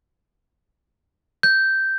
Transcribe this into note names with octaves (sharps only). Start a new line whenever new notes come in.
G6